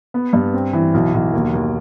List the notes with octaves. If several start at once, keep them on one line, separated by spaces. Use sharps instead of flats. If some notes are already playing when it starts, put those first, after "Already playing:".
B3
G2
C4
E3
B1
B1
D#2
D#2